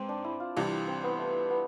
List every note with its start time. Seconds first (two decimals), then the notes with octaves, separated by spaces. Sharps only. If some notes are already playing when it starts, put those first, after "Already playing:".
Already playing: G#2 C4
0.09 D4
0.24 E4
0.40 F4
0.56 C2 C3 E3 D4
0.88 C4
1.04 B3
1.19 A3
1.50 B3